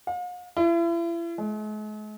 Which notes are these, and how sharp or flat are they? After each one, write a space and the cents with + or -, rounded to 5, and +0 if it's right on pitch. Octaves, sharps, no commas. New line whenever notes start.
F5 +45
E4 +40
G#3 +45